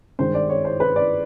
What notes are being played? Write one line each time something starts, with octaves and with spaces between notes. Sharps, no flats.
G2 D#3 G#3 C5
D5
C#5
C5
B4
D5